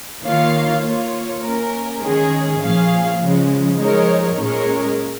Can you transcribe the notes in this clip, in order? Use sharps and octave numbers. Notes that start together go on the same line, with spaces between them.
D#3 A#3 F4 C#5 F5
A#3 F4 C#5
A#3 C#4 A#4
D#3 G#3 C#4 G#4 C#5
A#2 F3 C#4 G#4 F5
C#3 F3 G#3 C#4
F3 G#3 D#4 A#4 C#5
A#2 G#3 C#4 A#4 C#5